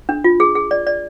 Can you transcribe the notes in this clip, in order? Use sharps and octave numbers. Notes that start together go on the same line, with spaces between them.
D4
F4
G#4
G#4
D5
D5